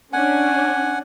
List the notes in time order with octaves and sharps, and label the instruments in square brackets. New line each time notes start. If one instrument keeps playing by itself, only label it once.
[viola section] C#4 D4 [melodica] F#5 G#5